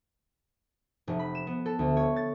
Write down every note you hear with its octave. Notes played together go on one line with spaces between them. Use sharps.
F1
B5
E7
B3
A4
D2
C#5
A6